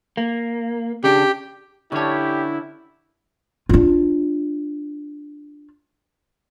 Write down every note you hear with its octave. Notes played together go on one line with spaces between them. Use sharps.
A#3
C#3 D4 G4
D3 C#4 D4 E4 G4 C#5
D4 F4